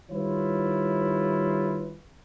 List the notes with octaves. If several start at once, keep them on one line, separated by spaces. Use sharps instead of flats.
D#3 G3 E4 F4 B4 C#5